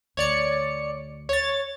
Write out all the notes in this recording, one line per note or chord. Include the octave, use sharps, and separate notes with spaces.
D2 C#5 D5 C#7
C#5 A6